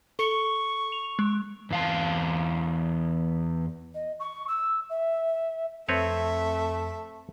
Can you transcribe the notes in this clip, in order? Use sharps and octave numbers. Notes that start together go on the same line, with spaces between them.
A4 C#6 C#7
F7
G#3
E2 F5 A5
D#5
C#6
E6
E5
F2 A3 C4 B4 C#5 E5 C#7